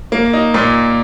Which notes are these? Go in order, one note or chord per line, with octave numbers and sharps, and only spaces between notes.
A#3
D#4
A#2